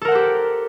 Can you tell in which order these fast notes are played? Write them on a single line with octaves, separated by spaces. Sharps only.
A4 A#4 F#5 C5 G4